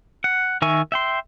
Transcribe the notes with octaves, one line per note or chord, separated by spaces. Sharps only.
F#5
D#3 A#4 E5 G#5 C#6
E5 G5 C6